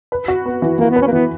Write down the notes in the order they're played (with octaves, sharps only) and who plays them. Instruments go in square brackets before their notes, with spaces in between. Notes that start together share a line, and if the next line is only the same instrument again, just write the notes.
[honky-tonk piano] B4
F#4
B3
E3
[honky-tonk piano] E3 [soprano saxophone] A#3
[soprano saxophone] B3
[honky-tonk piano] B4
[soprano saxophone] C#4
A#3
[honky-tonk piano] E3 [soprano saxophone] B3